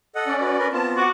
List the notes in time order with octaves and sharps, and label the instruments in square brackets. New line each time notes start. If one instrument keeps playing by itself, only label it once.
[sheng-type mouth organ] A4 D#5 F#5
[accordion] C#4 D5
[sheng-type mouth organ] F#4 B4
A#4 B4
[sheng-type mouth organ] B3 C4 F4 [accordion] A5
[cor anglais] F#4 [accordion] F#5 D6